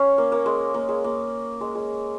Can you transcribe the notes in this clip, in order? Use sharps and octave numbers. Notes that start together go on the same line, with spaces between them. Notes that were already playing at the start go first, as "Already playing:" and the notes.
Already playing: C#4 C#5 F5
A#3
A#3
G#3
A#3
G#3
A#3
G#3
G#3